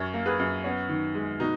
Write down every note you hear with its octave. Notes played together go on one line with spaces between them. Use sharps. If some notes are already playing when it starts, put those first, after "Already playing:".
Already playing: F#2 A#4 C#5
A#3
G#4 B4
F#2
B3 C#4
D#3
G#3
B2 D#4